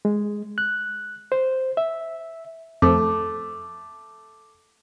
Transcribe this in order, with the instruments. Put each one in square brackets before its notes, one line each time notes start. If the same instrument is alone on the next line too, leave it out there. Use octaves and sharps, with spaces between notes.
[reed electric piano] G#3
F#6
C5
E5
[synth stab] F2 [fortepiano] A3 [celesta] D6